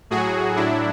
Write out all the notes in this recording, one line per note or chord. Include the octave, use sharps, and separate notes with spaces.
A2 F#3 F#4 G#4
A2 F#3 D4 E4